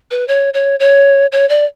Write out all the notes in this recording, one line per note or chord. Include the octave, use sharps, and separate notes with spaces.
B4
C#5
C#5
C#5
C#5
D5